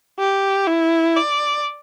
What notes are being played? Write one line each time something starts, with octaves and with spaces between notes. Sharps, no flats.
G4
E4
D5